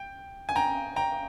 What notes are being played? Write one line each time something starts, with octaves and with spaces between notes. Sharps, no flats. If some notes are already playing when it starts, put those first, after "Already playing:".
Already playing: G5
G#5
G5 A#5
G5 A#5